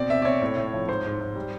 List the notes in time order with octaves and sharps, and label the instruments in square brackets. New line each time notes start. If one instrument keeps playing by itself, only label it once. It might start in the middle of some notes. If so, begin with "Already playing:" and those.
Already playing: [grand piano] B2 C4 D5
C4 E5
D5
C4 C#5
A2
A2
F3
G#2 C5
G#2
G#2
G3